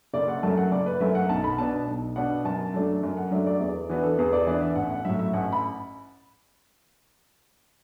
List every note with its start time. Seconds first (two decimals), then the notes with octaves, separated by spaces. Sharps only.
0.14 F#1 D5
0.28 F#5
0.43 F#2 F#3 A3 A5
0.57 F#5
0.72 F#1 D5
0.86 B4
1.00 F#2 F#3 A3 E5
1.15 F#5
1.29 B1 A5
1.44 B5
1.58 B2 B3 D4 A5
1.87 B1
2.16 B2 B3 D4 F#5
2.45 F#2 A5
2.74 F#3 A3 D4
3.03 F#2
3.17 F#5
3.31 F#3 A3 D4 E5
3.46 D5
3.60 E2 D5
3.89 E3 B3 D4 F#4
4.03 A4
4.18 E2 B4
4.33 D5
4.47 E3 B3 D4 D5
4.61 E5
4.76 A1 F#5
4.90 F#5
5.05 A2 F#3 E5
5.19 E5
5.33 A1 F#5
5.53 B5